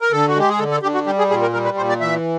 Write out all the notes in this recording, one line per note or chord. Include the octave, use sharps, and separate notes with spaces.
A#4
D3 A4
F#4
G#3 G4
G#4
D3 A4
A4
D3 G4
F#4
G3 G4
G#4
A#2 G#4
A#4
G3 A#4
B4
A#2 C5
D5
E3 E5